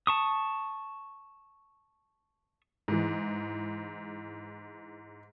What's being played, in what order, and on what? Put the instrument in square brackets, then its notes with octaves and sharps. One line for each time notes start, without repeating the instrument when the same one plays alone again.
[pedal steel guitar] A5 C#6 D#6
[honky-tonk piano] G#2 E3